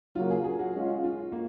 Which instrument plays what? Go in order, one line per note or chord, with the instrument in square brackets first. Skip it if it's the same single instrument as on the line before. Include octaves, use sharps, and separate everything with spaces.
[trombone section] C#3 F#3 A#3 [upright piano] F4
[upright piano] G#4
G#4
F#4
[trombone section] G#3 C#4 F4
[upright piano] F4
A#3